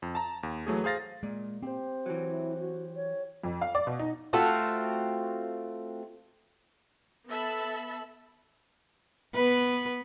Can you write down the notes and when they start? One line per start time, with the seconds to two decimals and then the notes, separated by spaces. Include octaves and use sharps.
0.02 F2
0.15 A5 A#5
0.43 D#2
0.67 E3 F#3 A3 G#4
0.84 G#4 C5 F5 A6 A#6
1.23 A#2 G#3
1.62 C4 G4 C5
2.06 E3 F#3
2.27 E4
2.60 F#4
2.96 C#5
3.44 F2
3.61 F5
3.75 D5
3.87 B2
3.99 D#4
4.33 A3 C4 F4 F#4
7.28 B3 A4 E5 A5 B5
9.35 B3 B4